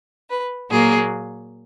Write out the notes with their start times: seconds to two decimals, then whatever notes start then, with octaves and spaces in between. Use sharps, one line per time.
0.30 B4
0.70 A#2 F#3 A#3 G#4